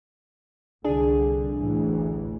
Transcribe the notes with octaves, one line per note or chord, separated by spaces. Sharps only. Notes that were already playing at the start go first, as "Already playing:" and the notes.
C2 D3 D4 G#4
A1 D2 E3